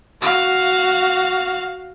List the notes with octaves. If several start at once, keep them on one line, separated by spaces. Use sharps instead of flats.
F#4 F5